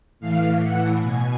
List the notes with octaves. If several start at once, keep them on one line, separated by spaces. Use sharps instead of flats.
A2 E3 F5
F#5
B2 G#5